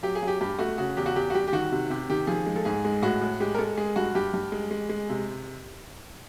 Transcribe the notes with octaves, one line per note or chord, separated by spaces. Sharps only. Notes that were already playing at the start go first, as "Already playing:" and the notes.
F#3 G4
G#4
F#3
G4
G2 G4
A3 F#4
C#3 F#4
E2 G4
F#4
E2 G4
F#4
G3 G4
G4
D#3 F#4
C3
C3 G4
D#3 G4
F3 G#4
G#3
A4
G#2 G#4
G#3
A2 F#4
A2
G#3 G4
A#4
G#3 A4
G#3 G#4
G2 F#4
G2 G4
G2
G#3
G#3
G#3
C3